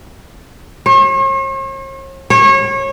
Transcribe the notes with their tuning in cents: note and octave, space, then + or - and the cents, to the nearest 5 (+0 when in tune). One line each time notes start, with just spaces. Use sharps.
C#5 -45
C#5 -30